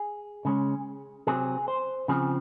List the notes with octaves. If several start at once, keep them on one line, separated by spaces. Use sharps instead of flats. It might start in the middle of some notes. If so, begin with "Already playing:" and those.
Already playing: G#4
C#3 G#3 C#4
C3 F#3 C4 G#4
C5
C#3 F3 C4 G#4